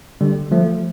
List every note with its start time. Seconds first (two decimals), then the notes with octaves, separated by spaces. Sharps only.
0.21 D3 G3
0.51 F3 A3